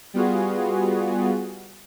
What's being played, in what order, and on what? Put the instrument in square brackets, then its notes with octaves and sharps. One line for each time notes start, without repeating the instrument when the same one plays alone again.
[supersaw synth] G3 B3 F4 F#4 G#4